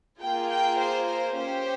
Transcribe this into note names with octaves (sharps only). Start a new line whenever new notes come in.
A#3 F4 G#4 G5
G5
C5
C5
C#4 G4 C5